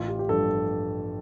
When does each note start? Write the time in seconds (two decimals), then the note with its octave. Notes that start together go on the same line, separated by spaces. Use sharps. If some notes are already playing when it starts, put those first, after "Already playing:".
Already playing: A1 F4
0.08 G4
0.19 G4
0.29 G2 F3 A4